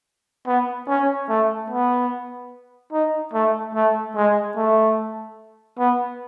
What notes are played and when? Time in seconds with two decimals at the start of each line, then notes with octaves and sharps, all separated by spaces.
0.47 B3
0.88 C#4
1.29 A3
1.70 B3
2.93 D#4
3.34 A3
3.75 A3
4.16 G#3
4.56 A3
5.79 B3